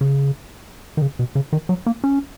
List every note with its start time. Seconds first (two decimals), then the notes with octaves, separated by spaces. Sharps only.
0.01 C#3
0.97 D#3
1.02 C#3
1.19 B2
1.35 C#3
1.53 D#3
1.69 F#3
1.86 A#3
2.04 C#4